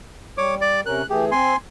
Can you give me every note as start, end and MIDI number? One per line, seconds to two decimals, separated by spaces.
0.38 0.81 55
0.38 0.55 73
0.38 0.55 86
0.61 0.81 74
0.86 1.02 48
0.86 1.02 61
0.86 1.02 70
0.86 1.06 90
1.10 1.30 52
1.10 1.30 57
1.10 1.25 67
1.10 1.30 68
1.31 1.54 60
1.31 1.56 80
1.31 1.56 84